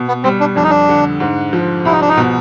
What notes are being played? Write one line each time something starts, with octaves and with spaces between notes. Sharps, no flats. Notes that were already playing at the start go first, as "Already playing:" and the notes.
Already playing: B2
B3
G3 C4
D4
F2 D4
D#4
D4
D3
G#2
F3
C2 E4
D#4
D4
D#4
B2